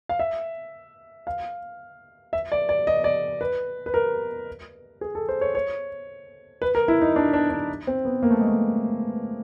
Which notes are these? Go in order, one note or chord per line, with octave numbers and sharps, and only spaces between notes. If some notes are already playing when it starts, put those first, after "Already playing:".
F5
E5
F5
E5
D5
D5
D#5
D5
B4
B4
A#4
G#4
A4
C5
C#5
C#5
B4
A#4
E4
D#4
D4
D4
D4
C4
B3
A#3
A3
G#3
A3